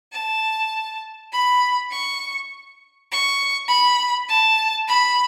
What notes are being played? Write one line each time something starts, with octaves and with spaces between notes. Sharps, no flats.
A5
B5
C#6
C#6
B5
A5
B5